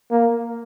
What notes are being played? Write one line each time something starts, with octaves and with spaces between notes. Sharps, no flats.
A#3